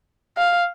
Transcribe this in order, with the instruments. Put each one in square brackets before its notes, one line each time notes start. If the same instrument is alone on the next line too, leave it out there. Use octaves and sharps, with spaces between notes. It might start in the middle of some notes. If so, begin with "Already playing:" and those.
[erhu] F5